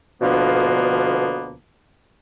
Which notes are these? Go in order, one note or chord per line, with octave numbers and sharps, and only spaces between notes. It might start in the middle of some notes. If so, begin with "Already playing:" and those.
D2 B2 D3 F3 A#3 B3